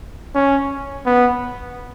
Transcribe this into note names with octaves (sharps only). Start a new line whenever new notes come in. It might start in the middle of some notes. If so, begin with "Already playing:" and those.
C#4
B3